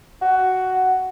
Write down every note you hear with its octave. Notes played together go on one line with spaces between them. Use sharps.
F#4